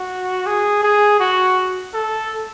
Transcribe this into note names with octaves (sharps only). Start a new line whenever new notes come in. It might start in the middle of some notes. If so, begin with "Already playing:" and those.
Already playing: F#4
G#4
G#4
F#4
A4